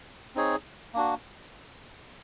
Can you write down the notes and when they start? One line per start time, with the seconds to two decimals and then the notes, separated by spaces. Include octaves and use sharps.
0.35 C4 D#4 G#4 C#5
0.94 A#3 D4 F#4